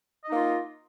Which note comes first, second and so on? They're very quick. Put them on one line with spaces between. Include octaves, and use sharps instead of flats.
D#5 D#4 A#3 F4